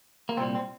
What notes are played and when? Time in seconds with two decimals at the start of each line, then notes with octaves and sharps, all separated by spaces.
0.29 A#3
0.37 C2 A#2 G3 C4
0.55 C4